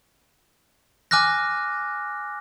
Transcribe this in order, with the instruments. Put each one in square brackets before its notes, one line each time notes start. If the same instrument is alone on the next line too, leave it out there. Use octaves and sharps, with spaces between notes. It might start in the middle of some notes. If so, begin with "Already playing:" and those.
[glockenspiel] G#5 D6 F6 F#6 A#6